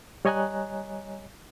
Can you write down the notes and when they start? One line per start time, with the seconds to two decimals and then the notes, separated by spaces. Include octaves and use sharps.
0.25 G3 C#5 D#5 G#5 A#5 F#6